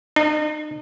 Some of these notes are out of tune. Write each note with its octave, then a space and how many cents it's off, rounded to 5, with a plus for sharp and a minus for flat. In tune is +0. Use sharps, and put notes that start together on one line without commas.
D#4 -40